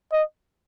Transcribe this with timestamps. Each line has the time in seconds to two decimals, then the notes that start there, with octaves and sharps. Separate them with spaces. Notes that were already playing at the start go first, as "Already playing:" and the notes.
0.12 D#5